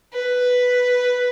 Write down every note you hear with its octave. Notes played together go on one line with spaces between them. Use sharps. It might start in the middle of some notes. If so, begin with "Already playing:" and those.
B4